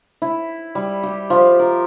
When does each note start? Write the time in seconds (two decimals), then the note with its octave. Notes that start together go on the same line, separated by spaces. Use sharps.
0.22 E4
0.75 G3
1.03 G4
1.30 F3
1.59 A#4